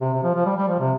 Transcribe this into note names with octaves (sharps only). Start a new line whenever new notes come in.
C3
C3
F3
F3
G3
G3
F3
C3